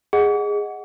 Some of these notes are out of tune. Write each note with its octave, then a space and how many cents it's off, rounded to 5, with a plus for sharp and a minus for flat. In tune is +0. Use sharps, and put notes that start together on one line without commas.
G#4 -10 D#5 +0 F#5 +0